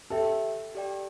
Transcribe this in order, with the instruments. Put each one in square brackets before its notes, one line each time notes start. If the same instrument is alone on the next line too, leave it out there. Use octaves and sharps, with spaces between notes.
[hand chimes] G4 E5 G5 [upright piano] A4
[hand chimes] G4 D5 G5